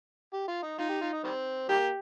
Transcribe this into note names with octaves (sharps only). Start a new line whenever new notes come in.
G4
F4
D#4
D#4 F4
G4
F4
D#4
D#3 G3 C4
D#3 G3 A#3 G4